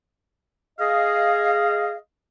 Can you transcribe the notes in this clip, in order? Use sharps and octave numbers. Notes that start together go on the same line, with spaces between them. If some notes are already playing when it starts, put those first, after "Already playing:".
G#4 D#5 F5